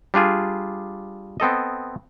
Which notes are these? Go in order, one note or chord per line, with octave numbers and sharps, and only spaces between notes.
G3 D4 F4 G#4
B3 C4 A4 D#5